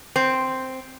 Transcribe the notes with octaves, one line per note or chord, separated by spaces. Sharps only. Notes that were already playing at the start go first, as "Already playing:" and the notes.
C4